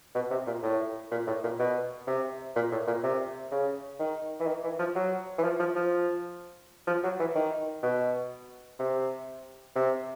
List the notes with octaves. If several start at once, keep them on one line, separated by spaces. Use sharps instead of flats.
B2
C3
A#2
A2
A#2
A2
A#2
B2
C3
A#2
A2
A#2
C3
C#3
D#3
E3
D#3
E3
F3
F#3
E3
F3
F3
F3
F3
F#3
E3
D#3
B2
C3
C3